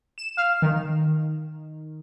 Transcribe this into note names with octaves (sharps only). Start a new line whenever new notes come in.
E7
F5
D#3